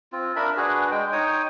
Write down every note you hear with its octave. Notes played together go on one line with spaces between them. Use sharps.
C4 F4
D4 A#4 E5 B5
D4 F#4 G#4 B4
G#3 G5
D#4 C#5 G5 D#6